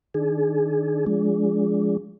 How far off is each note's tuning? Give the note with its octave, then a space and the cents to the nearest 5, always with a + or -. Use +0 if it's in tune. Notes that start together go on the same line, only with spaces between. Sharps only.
D#3 +0 D4 +0 G#4 +20
F3 +0 G#3 +0 D4 -25